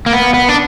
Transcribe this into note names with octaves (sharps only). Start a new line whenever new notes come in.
A#3
B3
B3
D4